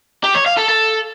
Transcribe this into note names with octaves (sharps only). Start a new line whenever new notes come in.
G4
C#5
F5
A4
A4